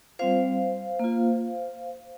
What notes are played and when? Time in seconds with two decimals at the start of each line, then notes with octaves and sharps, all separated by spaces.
0.19 G3 C4 F4 C5 F5
0.99 A#3 F4